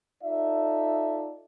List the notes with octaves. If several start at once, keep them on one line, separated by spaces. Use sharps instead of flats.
D#4 F4 A4 D5 E5